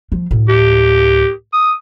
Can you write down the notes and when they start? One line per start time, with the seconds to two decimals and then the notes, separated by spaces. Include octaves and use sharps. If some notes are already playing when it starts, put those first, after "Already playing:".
0.12 F3
0.31 D2 A2
0.48 G4
1.53 D#6